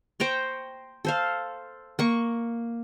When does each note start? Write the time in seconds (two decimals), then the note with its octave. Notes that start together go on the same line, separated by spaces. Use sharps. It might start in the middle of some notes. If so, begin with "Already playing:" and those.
0.20 C5 G5 A#5 C#6
1.05 A4 C5 F5
1.99 A#3 C#6